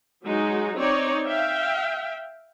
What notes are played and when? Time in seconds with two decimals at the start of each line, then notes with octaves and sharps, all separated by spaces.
0.23 F#3 G#3 D#4 F#4
0.78 C4 D#4 C#5 D5
1.27 E5 F5 G5